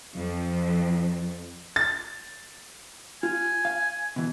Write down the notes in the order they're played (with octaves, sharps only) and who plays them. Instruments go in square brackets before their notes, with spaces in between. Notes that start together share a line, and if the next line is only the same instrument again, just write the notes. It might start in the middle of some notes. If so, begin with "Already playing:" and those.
[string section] F2
[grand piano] A6
[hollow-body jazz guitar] F4 [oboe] G#5
[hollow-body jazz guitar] F5
B2 E3